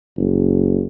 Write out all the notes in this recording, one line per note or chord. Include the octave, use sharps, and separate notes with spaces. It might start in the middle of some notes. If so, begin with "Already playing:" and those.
F#1